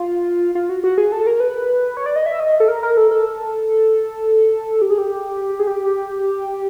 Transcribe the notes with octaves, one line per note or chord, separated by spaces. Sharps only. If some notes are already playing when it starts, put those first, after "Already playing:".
Already playing: F4
F4
F#4
F#4
G#4
A4
A#4
B4
C#5
D5
D#5
E5
D#5
A4
A#4
A#4
A4
A4
G4
G#4
G4
G#4
G4